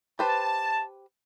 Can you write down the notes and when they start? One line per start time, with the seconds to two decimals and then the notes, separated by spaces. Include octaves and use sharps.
0.19 G4 B4 C5 A5